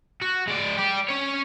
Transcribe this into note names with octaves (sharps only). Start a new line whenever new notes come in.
F#4
G#3 D5
G4 D5
C#4 C#5